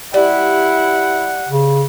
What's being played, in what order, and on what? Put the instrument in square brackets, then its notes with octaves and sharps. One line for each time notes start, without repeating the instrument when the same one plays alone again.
[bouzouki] G3 [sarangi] E4 [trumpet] F#5
[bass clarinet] C#3